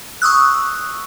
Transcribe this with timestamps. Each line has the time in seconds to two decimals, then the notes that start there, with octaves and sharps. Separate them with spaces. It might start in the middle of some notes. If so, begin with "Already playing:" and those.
0.22 C#6 D#6 E6 F#6